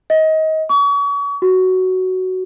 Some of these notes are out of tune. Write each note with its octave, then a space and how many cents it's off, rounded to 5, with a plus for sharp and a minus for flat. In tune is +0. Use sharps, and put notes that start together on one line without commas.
D#5 +25
C#6 +35
F#4 +10